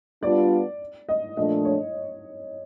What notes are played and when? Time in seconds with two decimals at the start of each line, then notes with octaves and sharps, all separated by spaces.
0.23 G3 B3 D4 F4 D5
1.09 D#5
1.36 A#2 F3 A3 D4 D#5
1.65 C#5